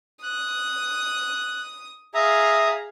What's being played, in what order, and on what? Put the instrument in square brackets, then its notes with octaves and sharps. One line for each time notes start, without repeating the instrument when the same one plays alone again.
[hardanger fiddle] D#6 [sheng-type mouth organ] F#6
[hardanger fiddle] G#4 F5 [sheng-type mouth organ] E5 A#5 D#6